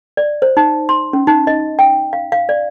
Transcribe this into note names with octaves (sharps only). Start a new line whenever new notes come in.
D5
C5
D#4
C6
C#4
D#4
D#5
G5
F5
F5
D5